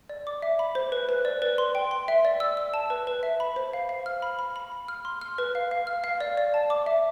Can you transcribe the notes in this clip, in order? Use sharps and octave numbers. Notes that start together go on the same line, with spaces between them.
D5
D6
E5
B5
C5
B4
B4
D5
B4
C6
G5
C6
E5
D5
E6
E6
A5
B4
B4
E5
B5
C5
F5
F5
F6
B5
B5
B5
B5
F6
C6
F6
B4
F5
F5
F6
F5
D5
D5
A5
D6
E5